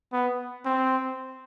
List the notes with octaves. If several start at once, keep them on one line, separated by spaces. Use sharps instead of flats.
B3
C4